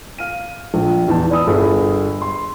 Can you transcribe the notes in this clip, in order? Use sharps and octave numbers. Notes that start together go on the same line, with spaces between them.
F5 F6 D#7
A#1
E2 D#4 A5
D5 B5 D#6 E6
G1 G3 G#4
C6